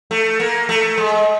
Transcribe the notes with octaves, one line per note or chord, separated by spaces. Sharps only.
A3
A#3
A3
G#3